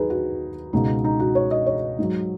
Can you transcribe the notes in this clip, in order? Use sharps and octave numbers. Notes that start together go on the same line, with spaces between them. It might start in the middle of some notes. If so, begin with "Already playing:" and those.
Already playing: D#2 D#3 F#3 D#4 G#4 B4
F#4
C#2 B2 G#3 D#4
D#4
F#4
C#5
D#5
C#5
G#2 F#3